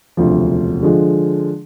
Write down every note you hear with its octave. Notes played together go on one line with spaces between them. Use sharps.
E1 D2 C3 F3
D3 F3 G#3